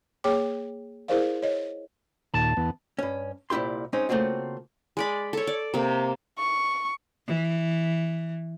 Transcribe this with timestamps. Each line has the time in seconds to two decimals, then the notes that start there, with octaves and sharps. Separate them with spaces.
0.24 A#3 G#4 C#5 G5 D6
1.08 E4 G#4 A#4 C5 D5 F5
1.43 C#5 D#5
2.34 D#2 A#2 A5
2.57 E2 B3
2.99 G2 C#4
3.50 C2 A#2 E4 G4 C6
3.93 G#3 C4 C#4 D#4
4.09 C#3 A3 A#3 C4 F4 F#4
4.97 G#3 D5 B5
5.33 A4 C#5
5.47 D5
5.74 C3 A#3
6.38 C#6
7.28 E3